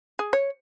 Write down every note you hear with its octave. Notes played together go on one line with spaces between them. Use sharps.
G#4
C#5